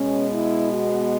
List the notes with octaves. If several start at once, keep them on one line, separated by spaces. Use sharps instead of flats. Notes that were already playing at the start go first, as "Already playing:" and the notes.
Already playing: B2 G#3 B3 C#4
E4
F#4